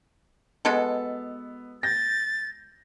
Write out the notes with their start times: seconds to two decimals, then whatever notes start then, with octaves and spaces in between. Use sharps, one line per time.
0.65 B2 G#3 B3 A4
1.83 G6 A6 A#6